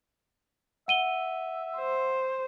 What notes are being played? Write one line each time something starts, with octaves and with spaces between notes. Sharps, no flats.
E5 F#5 D#7 G7
C5